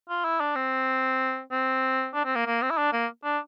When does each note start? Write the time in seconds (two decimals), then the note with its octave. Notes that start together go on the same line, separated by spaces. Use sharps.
0.09 F4
0.24 E4
0.40 D4
0.55 C4
1.51 C4
2.14 D4
2.25 C4
2.35 A#3
2.46 A#3
2.62 C4
2.70 E4
2.77 D4
2.92 A#3
3.24 D4